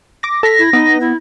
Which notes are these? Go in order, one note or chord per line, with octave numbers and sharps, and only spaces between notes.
D6 A#6
A4 A#6 B6
E4
B3 D#4
E4